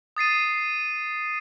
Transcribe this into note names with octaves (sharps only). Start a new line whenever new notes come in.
D#6 A6 C7 D#7